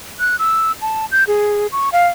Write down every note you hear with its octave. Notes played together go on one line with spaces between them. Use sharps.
F#6
E6
A5
G6
G#4
C#6
F5